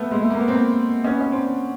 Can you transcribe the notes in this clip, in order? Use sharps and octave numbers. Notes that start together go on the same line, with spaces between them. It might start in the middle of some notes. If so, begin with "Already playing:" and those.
Already playing: A3 B3
G#3
A3
A#3
B3
A#3 C4
B3 C#4
C#4
C4 D4